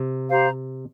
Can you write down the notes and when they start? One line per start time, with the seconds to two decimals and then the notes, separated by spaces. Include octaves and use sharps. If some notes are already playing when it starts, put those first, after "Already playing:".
Already playing: C3
0.29 G4 C5 F5 A#5